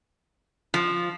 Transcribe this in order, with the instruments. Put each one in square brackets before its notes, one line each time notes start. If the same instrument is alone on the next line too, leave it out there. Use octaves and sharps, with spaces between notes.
[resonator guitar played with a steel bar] F3